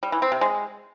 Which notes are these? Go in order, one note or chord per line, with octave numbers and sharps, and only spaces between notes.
G3
E3
C4
C3
G#3